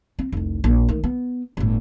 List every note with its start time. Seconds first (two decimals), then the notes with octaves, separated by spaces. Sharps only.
0.19 C4
0.32 F1 C2
0.64 A#1
0.89 D#3 A3
1.04 B3
1.57 G1 A2